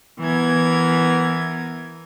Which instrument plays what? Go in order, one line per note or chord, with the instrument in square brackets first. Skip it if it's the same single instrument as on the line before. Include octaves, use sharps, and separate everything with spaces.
[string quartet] E3 B3 A#4 G#6